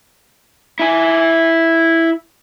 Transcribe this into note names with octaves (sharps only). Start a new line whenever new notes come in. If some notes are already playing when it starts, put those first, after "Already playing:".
E4 G#5